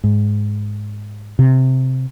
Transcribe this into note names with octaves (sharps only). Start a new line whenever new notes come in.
G#2
C3